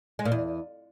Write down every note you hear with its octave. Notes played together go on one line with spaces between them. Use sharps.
G#3
A#2
E2